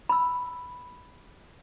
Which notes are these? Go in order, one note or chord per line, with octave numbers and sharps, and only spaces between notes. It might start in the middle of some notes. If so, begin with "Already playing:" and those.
B5 E6